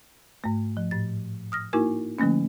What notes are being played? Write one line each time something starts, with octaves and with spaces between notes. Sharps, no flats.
G#2 A3
F3
A2 A6
D#6 F6 A#6
A#3 D#4 E4 F#4 A#4 G#5
D3 F3 A3 A#3 C#4